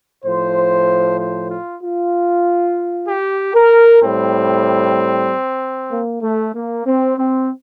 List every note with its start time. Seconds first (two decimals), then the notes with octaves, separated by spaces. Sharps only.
0.25 A2 F3 C5
1.19 C5
1.50 F4
1.82 F4
3.08 G4
3.55 A#4
4.02 A2 G3 C4
5.92 A#3
6.22 A3
6.55 A#3
6.86 C4
7.18 C4